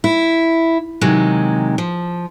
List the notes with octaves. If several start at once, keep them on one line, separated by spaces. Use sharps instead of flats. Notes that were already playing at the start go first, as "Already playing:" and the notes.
E4
C3 D#3 F#3 G#3
F3